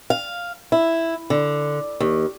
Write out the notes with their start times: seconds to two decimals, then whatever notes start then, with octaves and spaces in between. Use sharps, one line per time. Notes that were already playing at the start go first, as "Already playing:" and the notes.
0.10 F5
0.72 E4
1.30 D3
2.00 D#2